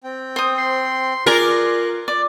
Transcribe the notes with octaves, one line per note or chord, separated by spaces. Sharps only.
C4 G5
C5 D#6
C6
F4 G#4 A#4 D5 D6 F#6
D5